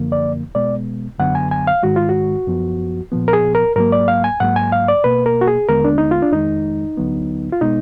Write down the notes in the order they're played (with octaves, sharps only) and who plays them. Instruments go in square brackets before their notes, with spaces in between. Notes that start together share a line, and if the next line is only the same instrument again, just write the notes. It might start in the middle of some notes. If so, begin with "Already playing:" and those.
Already playing: [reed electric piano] F#2 D3 F3 A#3
D5
B2 G#3 B3 D5
F#2 D3 F#3 B3 F#5
G#5
G#5
F5
G#2 D#3 G#3 F#4
F4
F#4
F#2 F3 B3
A#2 F3 B3
A#4
G#4
A#4
G#2 F#3 A#3 A#4
D5
F5
G#5
G#2 F#3 A#3 F#5
G#5
F5
D5
B2 A#3 B4
A#4
F#4
G#4
D#2 D3 G#3 B3 A#4
D4
D#4
F4
D4
F2 D#3 G#3 D#4
D2 D3 F#3 B3
F4
B2 G#3 B3 D#4